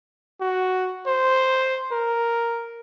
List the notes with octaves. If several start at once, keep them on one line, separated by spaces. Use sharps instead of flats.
F#4
C5
A#4